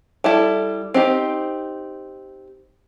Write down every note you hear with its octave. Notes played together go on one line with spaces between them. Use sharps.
G3 E4 A4
C4 D#4 G4